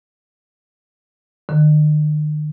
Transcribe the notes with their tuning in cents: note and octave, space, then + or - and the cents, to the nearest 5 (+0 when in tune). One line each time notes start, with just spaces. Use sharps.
D#3 -45